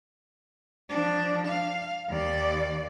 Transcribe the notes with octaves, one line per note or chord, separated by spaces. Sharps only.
F3 D4
F5
D#2 D5